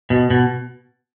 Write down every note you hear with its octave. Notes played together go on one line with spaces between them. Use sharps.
B2
B2